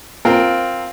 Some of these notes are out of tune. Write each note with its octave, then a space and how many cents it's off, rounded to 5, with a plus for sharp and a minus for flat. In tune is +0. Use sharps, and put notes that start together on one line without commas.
C4 +0 F4 +0 A#4 +0